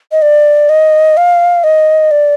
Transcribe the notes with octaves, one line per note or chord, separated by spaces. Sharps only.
D#5
D5
D#5
F5
D#5
D5